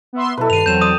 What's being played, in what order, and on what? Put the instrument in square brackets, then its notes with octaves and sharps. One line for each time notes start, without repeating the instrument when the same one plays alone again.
[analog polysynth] B3 E5 C6
[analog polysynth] B2 F#3 E4 [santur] A4 B4
[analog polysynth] G2 D#3 C7 [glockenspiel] D#7 F7
[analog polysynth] E2 F#3 C4 [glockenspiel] G6 E7
[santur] D5 [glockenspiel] D#6 D#7